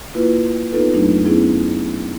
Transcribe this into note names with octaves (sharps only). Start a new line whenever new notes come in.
A#3 E4 F4 B4
B3 D#4 F4 A4 B4
F2 F#3 A3 D4 D#4
B3 C#4 E4 G#4